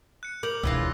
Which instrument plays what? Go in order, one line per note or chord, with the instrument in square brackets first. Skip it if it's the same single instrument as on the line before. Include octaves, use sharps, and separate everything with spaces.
[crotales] F#6 C#7
[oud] A#4 [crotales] D6 G6 F#7
[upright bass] E1 D4 [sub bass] C#2 [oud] C#3 E3 F4 [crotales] E6 A#6